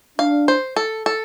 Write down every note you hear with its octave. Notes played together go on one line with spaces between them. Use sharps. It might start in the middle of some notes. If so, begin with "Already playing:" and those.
D4 F5
C5
A4
A4